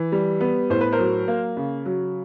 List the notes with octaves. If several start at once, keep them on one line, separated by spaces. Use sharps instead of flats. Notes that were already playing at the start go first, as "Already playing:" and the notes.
Already playing: E3
G3
B3
A2 C5
B4
A#4 C5
F#3
A#3
C#3
F#3